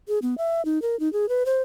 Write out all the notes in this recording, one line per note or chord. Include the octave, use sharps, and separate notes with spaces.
G#4
B3
E5
D#4
A#4
D#4
G#4
B4
C5